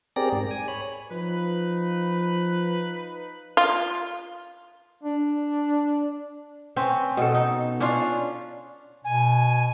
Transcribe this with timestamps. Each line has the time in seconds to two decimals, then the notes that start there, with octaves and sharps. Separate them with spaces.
0.16 C4 G4 G#4 A#4 D5 A#6
0.32 G#2
0.51 G#5
0.68 C#5 B5
1.11 F3 D#4 F4 B4
3.57 F4
5.03 D4
6.76 C4 C#4 B4
7.17 B2 A4
7.35 D#4
7.80 C#4 D4 F4 F5
9.05 B2 G#5